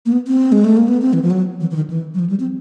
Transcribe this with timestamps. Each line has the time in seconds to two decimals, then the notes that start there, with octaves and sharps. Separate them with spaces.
0.06 A#3
0.12 B3
0.27 C4
0.52 G#3
0.64 A3
0.77 A#3
0.88 B3
1.02 C4
1.13 E3
1.22 F3
1.31 F#3
1.61 E3
1.71 E3
1.76 D#3
1.90 E3
2.14 F#3
2.19 F3
2.30 G3
2.40 C4